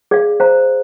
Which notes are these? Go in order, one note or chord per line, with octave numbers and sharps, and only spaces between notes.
G#4 D5 F5
C5 F5 A#5